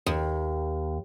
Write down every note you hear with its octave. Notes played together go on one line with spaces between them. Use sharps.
D#2